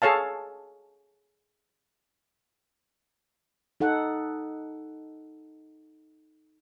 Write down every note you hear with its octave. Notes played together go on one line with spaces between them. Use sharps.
G#4 A4 C#5 F5 A5
D#4 A4 F#5